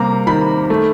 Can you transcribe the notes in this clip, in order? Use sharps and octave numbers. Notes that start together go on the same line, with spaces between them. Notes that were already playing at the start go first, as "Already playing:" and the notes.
Already playing: C3 G3 A#3 A#5
D#3 B5
A3